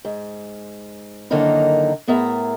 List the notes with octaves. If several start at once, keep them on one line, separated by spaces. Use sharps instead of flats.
G#2
F#2 D3 D#3 A#3 D#4 E4
A2 B3 G#4 A#4 E5 A#5